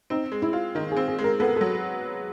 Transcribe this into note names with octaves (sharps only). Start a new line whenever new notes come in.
C4 D#4
G#3
E4
F4
D#3 D#4
G#4
C4
G#4
G#3
A#4
B3 A4
A#4
F#3 A4